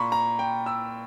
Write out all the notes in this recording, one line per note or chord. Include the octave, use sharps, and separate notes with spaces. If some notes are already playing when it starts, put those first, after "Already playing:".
Already playing: A#2 A#5 B5 C#6
A#5
G5
E6